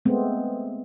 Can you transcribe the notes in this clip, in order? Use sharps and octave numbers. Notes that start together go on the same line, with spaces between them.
G#3 A3 B3 C4